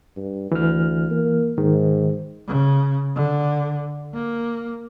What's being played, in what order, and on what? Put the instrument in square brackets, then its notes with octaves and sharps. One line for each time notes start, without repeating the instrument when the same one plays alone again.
[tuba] G2
[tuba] D2 [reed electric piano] E3 F6
[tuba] A#3
[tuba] G#2 [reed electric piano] D#3
[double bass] C#3
D3
A#3